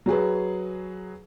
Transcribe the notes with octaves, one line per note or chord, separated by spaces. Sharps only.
F#3 F#4 G#4 B4